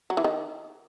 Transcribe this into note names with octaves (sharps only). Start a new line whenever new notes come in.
F#3
E3
D#3